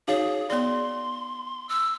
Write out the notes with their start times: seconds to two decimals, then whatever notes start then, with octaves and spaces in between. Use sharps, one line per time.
0.08 D#4 F#4 G#4 C#5 F5
0.50 B3 D5 C6
1.69 E6